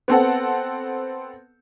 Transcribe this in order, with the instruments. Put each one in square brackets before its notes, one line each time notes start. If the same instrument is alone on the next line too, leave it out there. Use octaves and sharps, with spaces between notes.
[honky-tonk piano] B3 C4 A4 F#5